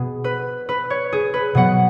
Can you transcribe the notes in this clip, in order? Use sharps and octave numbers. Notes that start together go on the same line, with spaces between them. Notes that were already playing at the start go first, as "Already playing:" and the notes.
Already playing: B2 B3 G#4
B4
B4
C#5
G#4
B4
B2 F#3 B3 F#5